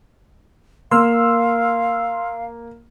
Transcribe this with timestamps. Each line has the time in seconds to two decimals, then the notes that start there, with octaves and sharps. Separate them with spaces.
0.91 A#3 F5 C6 E6 F6